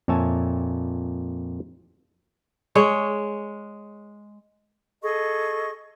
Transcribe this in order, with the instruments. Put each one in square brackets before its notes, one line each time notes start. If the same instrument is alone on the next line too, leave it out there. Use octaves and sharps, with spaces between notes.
[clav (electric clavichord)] F2 A#2 C#5 E5 G#5 A5
[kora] G#3 C#5
[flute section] G#4 A4 D#5 C#6